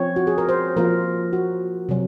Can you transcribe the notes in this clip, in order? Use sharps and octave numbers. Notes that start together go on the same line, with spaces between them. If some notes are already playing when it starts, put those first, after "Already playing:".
Already playing: F3 C4 F4 C#5
F#4
G#4
A#4
C5
F3 A#3 F4 A#4
F#4
C3 F#3